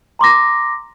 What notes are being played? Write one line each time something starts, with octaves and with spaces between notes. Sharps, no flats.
A#5 C6 D6 A#6